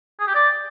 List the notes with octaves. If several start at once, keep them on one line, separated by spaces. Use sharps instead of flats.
G#4
G4
D5